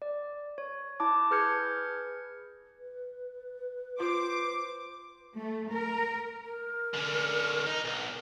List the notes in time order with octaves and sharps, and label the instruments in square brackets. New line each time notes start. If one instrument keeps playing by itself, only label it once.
[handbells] D5
C#5
E4 A5 D6
G#4 B4 F6 G6 G#6 C#7
[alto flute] B4
[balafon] F4 [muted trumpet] C5 [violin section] D6
[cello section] A3
A#4
[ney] A#4
[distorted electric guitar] D3 C#4
D#4
B1